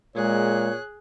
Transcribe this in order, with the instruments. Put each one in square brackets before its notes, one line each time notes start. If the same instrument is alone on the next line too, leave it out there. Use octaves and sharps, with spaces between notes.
[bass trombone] A#2 [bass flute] G#3 [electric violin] G#4 F#6 [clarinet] C#5